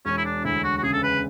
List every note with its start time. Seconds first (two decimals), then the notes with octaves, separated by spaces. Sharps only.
0.05 E1 C#4
0.17 E4
0.25 D4
0.44 D2 E4
0.63 F#4
0.77 F#4
0.83 C#3 G#4
0.93 A4
1.03 B4